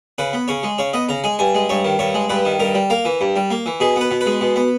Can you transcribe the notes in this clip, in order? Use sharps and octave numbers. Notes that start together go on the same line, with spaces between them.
C#3 B4
B3
C#3 C#5
G#3
C#3 C#5
B3 D#5
C#3 A#5
G#3 G#5
G2 G#5
G#3
G2 C#5
D#3
G2 C#5
G#3
G2 B4
D#3
G2 A#4
G3
A#3 A#4
E3
G2
G3
A#3
E3
B2 G#4
B3 B4
B2
B4
G#3
B2
B3